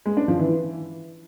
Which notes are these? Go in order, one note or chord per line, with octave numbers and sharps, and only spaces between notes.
G#3
D4
F3
E3